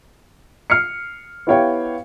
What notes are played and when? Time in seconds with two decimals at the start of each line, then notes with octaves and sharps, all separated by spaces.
0.70 F6 C7 C#7
1.47 B3 E4 G4 C#5 F5 G5